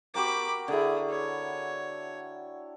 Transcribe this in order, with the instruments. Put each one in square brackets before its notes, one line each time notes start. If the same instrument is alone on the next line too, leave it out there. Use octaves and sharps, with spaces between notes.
[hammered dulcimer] F#4 G4 A#4 [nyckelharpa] B5 D6
[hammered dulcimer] D3 E4 [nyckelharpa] G#4
[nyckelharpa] C#5